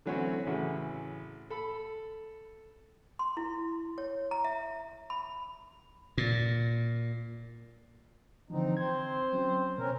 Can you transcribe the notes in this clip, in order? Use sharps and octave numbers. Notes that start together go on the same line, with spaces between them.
D3 E3 F#3 A3 C4 C#4
A1 C#3 E3 F#4
A4 B5
C6
E4
C#5
A#5
E5
B5
A#2
D3 E3 F3 C4 D#4
C4 C5 G#6
F#3 C#4
B2 C4 C#4 A#4